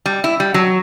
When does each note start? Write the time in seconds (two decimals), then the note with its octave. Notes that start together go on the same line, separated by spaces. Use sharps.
0.06 G3
0.24 E4
0.40 G3
0.54 F#3